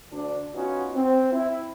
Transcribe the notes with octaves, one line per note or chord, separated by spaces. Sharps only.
D2 D4
B3 C#4 D#4 F4 F#4
C4
E4